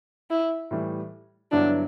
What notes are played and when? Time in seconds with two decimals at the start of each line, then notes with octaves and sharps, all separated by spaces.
0.30 E4
0.71 A2 E3 G3
1.52 G2 D3 F#3 B3 D4 E4